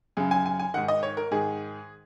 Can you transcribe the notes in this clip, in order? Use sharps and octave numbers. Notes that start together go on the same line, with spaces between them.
F#2 C#3 G#4
G#5
G#5
G#5
G#2 D#3 F#5
D#5
C#5
A#4
G#2 D#3 G#4